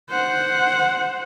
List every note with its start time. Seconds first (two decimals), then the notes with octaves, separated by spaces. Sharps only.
0.11 C5 F#5